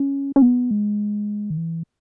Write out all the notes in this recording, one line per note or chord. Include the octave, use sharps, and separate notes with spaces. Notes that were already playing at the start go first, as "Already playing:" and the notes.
Already playing: C#4
C#4
B3
G#3
D#3
E3